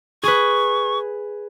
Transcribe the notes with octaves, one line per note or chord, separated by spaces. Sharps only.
G#4 B4 C#6